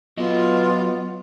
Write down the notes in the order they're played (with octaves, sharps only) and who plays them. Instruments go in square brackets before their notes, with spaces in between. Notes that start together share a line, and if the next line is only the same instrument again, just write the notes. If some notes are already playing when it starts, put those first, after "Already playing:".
[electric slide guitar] F#3 D#5 [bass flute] B3 [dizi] F4